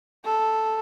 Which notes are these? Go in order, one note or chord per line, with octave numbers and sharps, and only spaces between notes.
A4